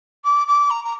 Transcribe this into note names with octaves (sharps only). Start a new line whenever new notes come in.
D6
D6
A#5
A#5